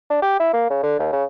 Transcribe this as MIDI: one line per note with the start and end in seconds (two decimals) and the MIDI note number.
0.10 0.19 62
0.22 0.38 67
0.39 0.49 64
0.53 0.68 58
0.70 0.81 49
0.83 0.97 50
0.99 1.09 39
1.12 1.24 49